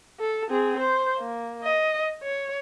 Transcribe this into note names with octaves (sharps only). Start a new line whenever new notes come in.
A4
C4 G#4
C5
A#3
D#5
C#5